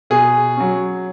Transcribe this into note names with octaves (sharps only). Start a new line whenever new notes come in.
B2 G#4
F#3 C#4